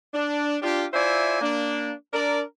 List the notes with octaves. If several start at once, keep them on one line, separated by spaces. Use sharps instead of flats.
D4
D4 F4 G4
E4 F4 C5 D5 E5 G#5
A#3 D4
D4 A#4 D5